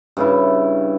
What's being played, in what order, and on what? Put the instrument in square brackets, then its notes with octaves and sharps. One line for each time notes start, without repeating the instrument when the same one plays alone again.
[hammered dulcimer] G2 C#3 E4